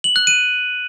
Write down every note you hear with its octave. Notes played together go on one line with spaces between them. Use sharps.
F#7
F#6
D#7